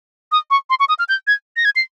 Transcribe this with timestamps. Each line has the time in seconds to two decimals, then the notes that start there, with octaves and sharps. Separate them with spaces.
0.32 D#6
0.50 C#6
0.70 C6
0.80 C#6
0.89 D#6
0.99 F6
1.09 G6
1.27 G#6
1.57 A#6
1.65 G#6
1.76 C7